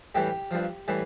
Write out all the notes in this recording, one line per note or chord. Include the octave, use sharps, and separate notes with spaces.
A2 E3 G3 G4
G2 F3
A2 E3 G3